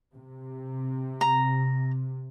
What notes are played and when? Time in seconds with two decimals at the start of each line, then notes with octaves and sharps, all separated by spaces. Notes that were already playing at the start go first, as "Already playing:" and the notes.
0.14 C3
1.21 A#5